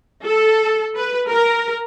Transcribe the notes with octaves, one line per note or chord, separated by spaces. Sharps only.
A4
B4
A#4